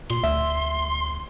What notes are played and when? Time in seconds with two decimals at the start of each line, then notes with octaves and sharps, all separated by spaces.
0.10 A#2 C6
0.23 D2 E5